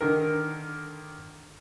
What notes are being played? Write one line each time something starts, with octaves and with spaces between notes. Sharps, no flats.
D3 D#3 A#4